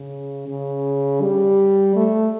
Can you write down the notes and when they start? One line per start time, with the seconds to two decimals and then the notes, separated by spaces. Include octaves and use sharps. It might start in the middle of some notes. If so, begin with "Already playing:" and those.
Already playing: C#3
0.48 C#3
1.21 G3
1.96 A3